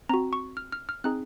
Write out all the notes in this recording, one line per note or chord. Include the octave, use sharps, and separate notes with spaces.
C4 F#4 A#5
C#6
F6
F6
F6
C4 D#4 G#4 F#6